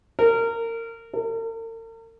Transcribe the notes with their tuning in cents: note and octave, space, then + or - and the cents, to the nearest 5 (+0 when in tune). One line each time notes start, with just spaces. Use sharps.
A#4 -25
A#4 -45